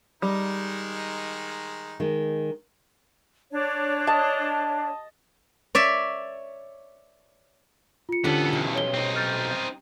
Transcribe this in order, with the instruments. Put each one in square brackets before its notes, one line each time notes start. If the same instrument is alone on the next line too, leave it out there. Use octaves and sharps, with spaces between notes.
[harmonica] D#3 G#3 D#4 [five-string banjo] G3
[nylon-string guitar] D#3 G#3
[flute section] D4 C#5
[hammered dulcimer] D#5 A5
[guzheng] C#5 D5 E5
[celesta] F4 C#7
[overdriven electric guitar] E2 A4 [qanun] D3 G3 C#4 [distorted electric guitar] B3
[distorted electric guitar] B1 [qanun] D#5
[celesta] C#5 G7
[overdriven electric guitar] C4 D#4
[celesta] F6 G6 A6